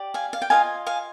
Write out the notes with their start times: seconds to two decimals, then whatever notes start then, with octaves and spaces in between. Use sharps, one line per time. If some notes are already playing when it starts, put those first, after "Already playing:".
Already playing: G4 D5
0.14 F5 G#5
0.33 F5
0.42 G5
0.50 F4 A#4 D#5 F5 G#5
0.87 F5 G#5